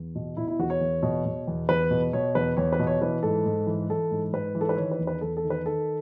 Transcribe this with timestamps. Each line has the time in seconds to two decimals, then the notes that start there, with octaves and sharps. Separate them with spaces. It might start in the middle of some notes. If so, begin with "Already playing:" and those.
Already playing: E2
0.15 B2
0.37 B2 E4
0.48 E4
0.59 E2 F#4
0.70 C#5
0.81 E2
1.03 B2
1.25 B2
1.47 E2
1.69 E2 B4
1.91 B2
2.13 B2 C#5
2.35 E2 B4
2.57 E2 C#5
2.73 B4
2.79 B2
2.87 C#5
3.01 E3 B4
3.23 G#2 A4
3.46 G#2
3.67 E3
3.90 E3 A4
4.11 G#2
4.33 G#2 B4
4.55 E3
4.61 A4
4.69 B4
4.77 D#3 C#5
4.91 B4
4.99 E2
5.07 B4
5.21 E2 A4
5.37 A4
5.44 D#3
5.50 B4
5.65 D#3 A4